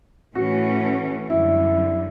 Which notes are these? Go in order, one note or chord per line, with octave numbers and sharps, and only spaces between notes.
A2 E3 A3 C#4 F#4
F#2 D3 G3 E4